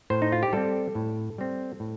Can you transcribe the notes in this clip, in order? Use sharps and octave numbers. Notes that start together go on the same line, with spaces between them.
A2 C5
D#4
F4
G4
G3 C4 A4
A2
G3 C4
A2